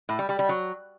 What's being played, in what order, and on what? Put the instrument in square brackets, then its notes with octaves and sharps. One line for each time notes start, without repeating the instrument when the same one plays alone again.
[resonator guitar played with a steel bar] A2
G3
G3
G3
F#3